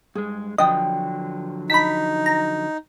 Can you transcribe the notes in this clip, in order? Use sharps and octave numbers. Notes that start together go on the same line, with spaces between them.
G2 G#3 G#4
D3 F3 F#3 B4 D5 D#5 G5
D#4 A5 B5 B6
A#5